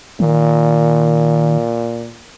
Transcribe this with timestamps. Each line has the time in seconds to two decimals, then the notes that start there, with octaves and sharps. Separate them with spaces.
0.20 A#2 D#3